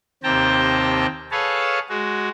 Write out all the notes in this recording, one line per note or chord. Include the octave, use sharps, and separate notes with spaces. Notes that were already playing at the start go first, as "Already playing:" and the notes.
D#2 C3 C4 G5 A5 A#5
G#4 A4 B4 C#5 F5 A5
G#3 F#4